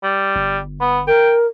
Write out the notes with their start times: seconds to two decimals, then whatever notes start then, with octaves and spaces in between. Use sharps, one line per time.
0.03 G3
0.36 G1
0.80 B3
1.07 A#4 G5